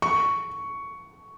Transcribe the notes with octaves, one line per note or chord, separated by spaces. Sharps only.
C#6